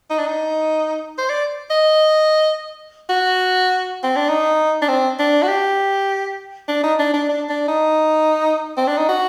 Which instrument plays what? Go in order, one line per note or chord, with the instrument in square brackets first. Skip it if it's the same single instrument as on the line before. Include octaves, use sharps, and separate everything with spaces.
[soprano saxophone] D#4
D4
D#4
C5
D5
D#5
F#4
C4
D4
D#4
D4
C4
D4
F#4
G4
D4
D#4
D4
D4
D4
D4
D#4
C4
D4
D#4
F#4